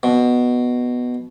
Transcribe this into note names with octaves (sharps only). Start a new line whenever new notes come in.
B2